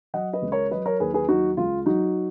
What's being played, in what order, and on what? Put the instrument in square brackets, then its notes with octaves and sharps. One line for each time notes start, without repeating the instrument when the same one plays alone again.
[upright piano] F#3 D#5 F#5
B4 D#5
C#2
A#4 C#5
F#3 B4 D#5
A#4 C#5
D#2 G#4 B4
G#4 B4
F#3 D#4 F#4
C#2 F4
F#3 D#4 F#4